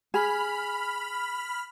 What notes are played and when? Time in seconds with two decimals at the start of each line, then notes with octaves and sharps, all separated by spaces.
0.14 G#4 B5 F6